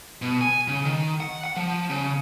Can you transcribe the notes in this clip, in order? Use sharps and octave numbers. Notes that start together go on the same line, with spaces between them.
B2
G#5
C#3
D#3
F#5
F#5
F3
C#3